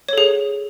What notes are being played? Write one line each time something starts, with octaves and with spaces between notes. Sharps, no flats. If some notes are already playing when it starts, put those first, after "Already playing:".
G#4 A4 C#5